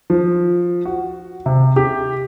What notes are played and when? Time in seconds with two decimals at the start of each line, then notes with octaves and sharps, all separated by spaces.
0.10 F3
0.85 F#4
1.46 C3
1.76 G4